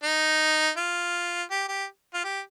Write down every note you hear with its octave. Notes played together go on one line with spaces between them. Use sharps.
D#4
F4
G4
G4
F4
G4